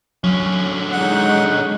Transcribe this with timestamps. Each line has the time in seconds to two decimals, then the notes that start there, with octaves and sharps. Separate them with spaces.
0.24 D3 F#3 C#4
0.92 G#3 D#4 F#5